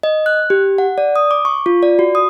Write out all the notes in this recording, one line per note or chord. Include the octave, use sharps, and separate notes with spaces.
D#5
F#6
G4
F#5
D5
D#6
D6
C#6
F4
D5
F#4
D#6